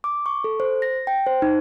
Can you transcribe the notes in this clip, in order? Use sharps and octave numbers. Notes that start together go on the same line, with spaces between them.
D6
C#6
A4
C5
A#6
G5
C5
D#4